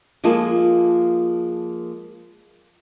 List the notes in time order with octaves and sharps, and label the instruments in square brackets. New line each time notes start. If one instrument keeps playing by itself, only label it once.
[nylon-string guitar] F3 G#3 A#3 F4 G#4 A4